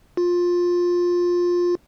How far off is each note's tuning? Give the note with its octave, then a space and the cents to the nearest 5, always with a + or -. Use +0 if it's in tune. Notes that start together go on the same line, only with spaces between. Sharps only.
F4 +15